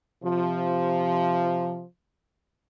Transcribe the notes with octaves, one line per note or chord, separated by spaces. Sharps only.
C3 F3